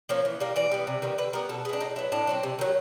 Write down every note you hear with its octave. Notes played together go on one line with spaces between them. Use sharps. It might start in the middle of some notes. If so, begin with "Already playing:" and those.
F3 A#3 C#4
E3
G3 A#3
E3 D5
G3 B3
C3
D#3 G3 B3
D3 B4
G3 B3 A#4
B2 A4
G#3 B3 D4 G#4
A2 D#4
F#3 B3 E4
A2 D4
F#3 A3 C4
C3
D#3 F#3